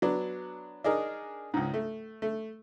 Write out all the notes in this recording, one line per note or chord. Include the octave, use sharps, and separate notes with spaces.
F#3 B3 D4
D4 D#4 G#4 A#4
C#2 G#2
A3
A3